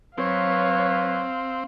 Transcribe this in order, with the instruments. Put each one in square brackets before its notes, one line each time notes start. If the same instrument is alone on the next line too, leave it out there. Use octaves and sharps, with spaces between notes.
[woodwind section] F#3 B4 [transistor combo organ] C4 [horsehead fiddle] C#5 [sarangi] F5